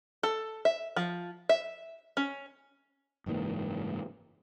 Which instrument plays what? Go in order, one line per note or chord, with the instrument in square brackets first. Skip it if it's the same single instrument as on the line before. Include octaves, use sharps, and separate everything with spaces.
[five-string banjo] A4
E5
F3
E5
C#4
[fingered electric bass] F#1 G#2 E3 A#3